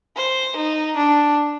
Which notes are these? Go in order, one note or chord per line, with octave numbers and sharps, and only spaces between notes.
C5
D#4
D4